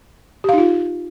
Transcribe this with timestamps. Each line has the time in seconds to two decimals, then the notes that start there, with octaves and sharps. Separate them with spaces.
0.44 G4
0.49 F5
0.53 D#4
0.58 F4